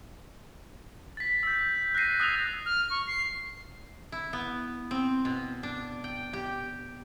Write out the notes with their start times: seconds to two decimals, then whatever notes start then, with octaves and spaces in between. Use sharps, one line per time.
1.17 A6 B6
1.43 E6 G6
1.75 G6
1.95 F#6 G6 A#6 C7 D#7
2.20 D#6 E6 F#6 G#6 A6 F7
2.66 F6
2.90 C#6
3.07 C7
4.12 E4
4.33 B3
4.91 C4
5.25 B2
5.63 D4
6.04 G5
6.33 G4